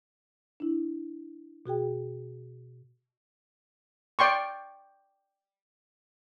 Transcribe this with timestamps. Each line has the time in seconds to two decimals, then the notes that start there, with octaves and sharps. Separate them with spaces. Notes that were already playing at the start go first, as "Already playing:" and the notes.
0.60 D4 E4
1.66 B2 F#4 G#4 G5
4.19 D5 G5 C6 C#6